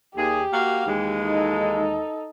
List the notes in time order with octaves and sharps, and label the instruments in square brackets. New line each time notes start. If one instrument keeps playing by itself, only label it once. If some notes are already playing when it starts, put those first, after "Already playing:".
[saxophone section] D#2 G#4 [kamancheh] G4
[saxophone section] A#3 F#4 F5
D#2 E3 G#3
[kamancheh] D#4 A4